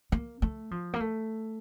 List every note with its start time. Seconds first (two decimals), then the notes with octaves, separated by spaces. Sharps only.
0.12 A#3
0.42 A3
0.71 F3
0.94 A#3
1.00 A3